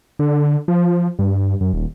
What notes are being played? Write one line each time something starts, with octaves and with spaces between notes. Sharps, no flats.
D3
F3
G2
F#2
D#1